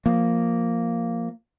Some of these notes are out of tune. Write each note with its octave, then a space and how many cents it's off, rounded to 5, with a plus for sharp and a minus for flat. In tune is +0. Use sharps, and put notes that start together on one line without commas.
F3 +0 A#3 -5